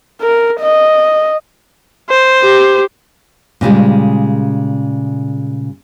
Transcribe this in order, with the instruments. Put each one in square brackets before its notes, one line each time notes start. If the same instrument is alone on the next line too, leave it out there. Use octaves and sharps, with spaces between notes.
[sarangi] A#4
D#5
[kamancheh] C5
[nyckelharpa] G4
[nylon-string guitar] A#2 C#3 G3 G#3